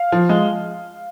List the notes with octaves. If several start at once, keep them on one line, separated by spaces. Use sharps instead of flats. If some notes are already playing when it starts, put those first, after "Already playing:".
Already playing: F5
F3
G#3